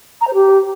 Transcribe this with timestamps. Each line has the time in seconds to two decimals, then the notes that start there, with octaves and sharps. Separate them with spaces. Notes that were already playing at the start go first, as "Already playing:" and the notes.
0.21 A#5
0.28 C5
0.34 G4